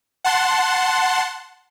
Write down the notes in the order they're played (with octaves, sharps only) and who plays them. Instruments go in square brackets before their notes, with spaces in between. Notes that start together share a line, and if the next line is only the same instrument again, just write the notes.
[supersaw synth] F#5 A5 C6